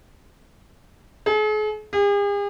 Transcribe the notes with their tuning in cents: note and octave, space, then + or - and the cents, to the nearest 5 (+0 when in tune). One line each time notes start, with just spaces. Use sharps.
G#4 +45
G#4 -45